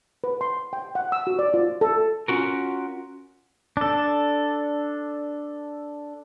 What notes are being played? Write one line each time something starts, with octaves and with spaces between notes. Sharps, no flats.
B4
C6
G5
F#5
E6
F#4
D5
F4
A4
C#4 F4 F#4 A#4
D4 A4